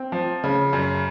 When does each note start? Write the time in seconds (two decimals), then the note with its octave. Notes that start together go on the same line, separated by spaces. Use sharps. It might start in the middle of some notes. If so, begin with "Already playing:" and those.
Already playing: C4
0.12 F3
0.44 C#3
0.73 F#2